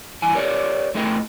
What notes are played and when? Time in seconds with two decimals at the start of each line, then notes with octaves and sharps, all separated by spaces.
0.22 G2 E3 E4 G#5
0.35 G4 A#4 C#5 D5
0.95 A2 A3 G#4 A#4 D#5 G5